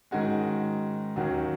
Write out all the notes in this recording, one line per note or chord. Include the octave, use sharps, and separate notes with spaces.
G#2 D#3 G#3 C#4 F#4
D#2 D#3 F#3 C#4 F#4